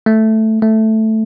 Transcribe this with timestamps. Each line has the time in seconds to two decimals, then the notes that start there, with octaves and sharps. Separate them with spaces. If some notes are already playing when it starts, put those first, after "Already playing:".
0.06 A3
0.62 A3